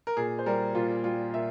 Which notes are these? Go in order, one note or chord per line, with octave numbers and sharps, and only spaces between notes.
A#4
A#2 G#4
C5
G3 A#4
A#2 F4
G3 F4
A#2 E5